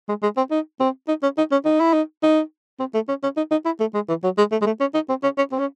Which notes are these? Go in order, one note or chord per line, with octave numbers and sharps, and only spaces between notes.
G#3
G#3
C4
D#4
C4
D#4
C#4
D#4
C#4
D#4
E4
D#4
D#4
C4
A3
C#4
C#4
D#4
D#4
E4
A3
G#3
E3
F#3
G#3
A3
G#3
A3
C#4
D#4
C4
C#4
C#4
C4
C#4